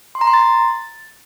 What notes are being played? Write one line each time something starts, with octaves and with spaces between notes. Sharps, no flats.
C6
A#5
C6
A6